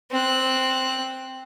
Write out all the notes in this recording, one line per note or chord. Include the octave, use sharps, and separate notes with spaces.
C4 F#6